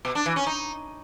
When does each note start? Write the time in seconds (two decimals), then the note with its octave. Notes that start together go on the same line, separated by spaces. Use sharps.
0.05 B2
0.15 D4
0.26 E3
0.36 C#4
0.47 D#4